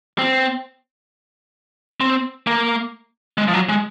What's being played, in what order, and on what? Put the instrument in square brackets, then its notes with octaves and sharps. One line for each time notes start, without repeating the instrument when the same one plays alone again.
[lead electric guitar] C4
C4
A#3
G#3
F3
F#3
G#3